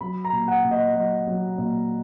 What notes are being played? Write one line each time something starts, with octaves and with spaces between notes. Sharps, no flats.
F#3 B5
A#5
A#2
F#5
A#2
D#5
F#3 D#5
F#3
A#2